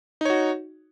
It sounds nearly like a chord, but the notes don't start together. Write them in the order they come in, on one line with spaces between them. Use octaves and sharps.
D#4 C#5 F#4